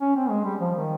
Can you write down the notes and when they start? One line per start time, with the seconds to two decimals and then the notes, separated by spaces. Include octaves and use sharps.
0.01 C#4
0.16 C4
0.30 G#3
0.45 G3
0.61 F3
0.75 D#3